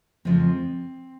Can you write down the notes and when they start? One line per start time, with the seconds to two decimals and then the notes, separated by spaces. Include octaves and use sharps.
0.25 F2 C#3 F3 G#3 C4